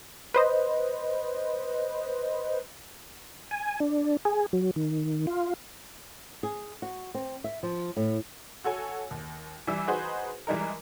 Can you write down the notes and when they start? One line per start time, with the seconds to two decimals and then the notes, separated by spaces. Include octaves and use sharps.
0.34 B4 C5 D#5
3.51 G#5
3.80 D4
4.25 G#4
4.53 F#3
4.76 D#3
5.27 F4
6.43 G#4
6.82 F#4
7.14 C4
7.44 E5
7.63 F3
7.96 A2
8.64 F#4 A4 C#5 G#5
9.11 D#2
9.67 E3 G3 E6
9.87 D#4 F#4 G#4 B4 C5
10.47 E3 G3 G#3 D#4 A#4